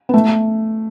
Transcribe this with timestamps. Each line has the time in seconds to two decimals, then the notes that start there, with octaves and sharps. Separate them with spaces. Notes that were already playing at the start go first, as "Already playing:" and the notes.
0.09 B3
0.14 A3